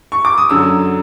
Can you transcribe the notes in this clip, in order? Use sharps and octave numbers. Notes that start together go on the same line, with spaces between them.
C#6
D6
D#6
F#2 D3 F#3 E6